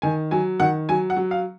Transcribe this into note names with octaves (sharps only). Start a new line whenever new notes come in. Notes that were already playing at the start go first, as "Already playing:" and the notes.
D#3 G#5
F#3 G#5
D#3 F#5
F#3 G#5
F#5
F#3
F5